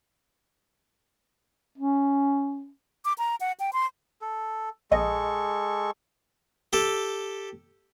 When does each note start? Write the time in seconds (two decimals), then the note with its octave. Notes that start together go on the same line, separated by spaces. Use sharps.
1.78 C#4
3.05 D6
3.18 A#5
3.41 F#5
3.60 G5
3.73 C6
4.21 A4
4.91 A#1 G#3 A4 D#5 C#6
6.73 G4 A4